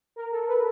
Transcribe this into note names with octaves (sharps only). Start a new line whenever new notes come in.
A#4
A4
B4